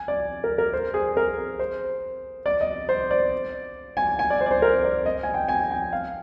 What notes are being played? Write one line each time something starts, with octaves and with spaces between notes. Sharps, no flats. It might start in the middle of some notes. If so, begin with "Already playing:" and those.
Already playing: G#5
D5
A#4
A#4
C5
G#4
A#4
C5
D5
D#5
C5
D5
G#5
G#5
D5
C5
D5
C5
A#4
D5
D#5
G#5
G5
G#5
G5
F5